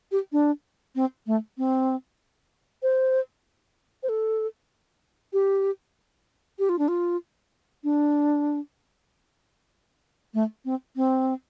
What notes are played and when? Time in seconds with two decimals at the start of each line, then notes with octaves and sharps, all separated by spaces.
0.12 G4
0.32 D4
0.95 C4
1.27 A3
1.58 C4
2.83 C5
4.03 C5
4.09 A4
5.33 G4
6.59 G4
6.69 F4
6.79 D4
6.88 F4
7.84 D4
10.34 A3
10.65 C4
10.96 C4